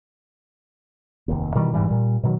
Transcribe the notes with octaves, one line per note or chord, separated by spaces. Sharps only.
F1 D#2
B2 D#3 E3 G3
E1 G#2 E3 G3
A#2 G3
B2 D#3 F#3